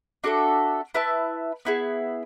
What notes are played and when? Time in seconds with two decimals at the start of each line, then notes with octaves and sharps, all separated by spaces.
0.24 D4 F#4 A4 E5
0.94 E4 B4 E5 A5
1.65 B3 E4 G#4